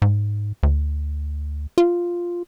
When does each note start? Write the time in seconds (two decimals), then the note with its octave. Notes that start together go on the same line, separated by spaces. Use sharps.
0.02 G#2
0.63 D2
1.78 F4